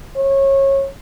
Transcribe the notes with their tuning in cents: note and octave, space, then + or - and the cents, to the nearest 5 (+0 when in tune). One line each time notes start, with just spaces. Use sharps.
C#5 -25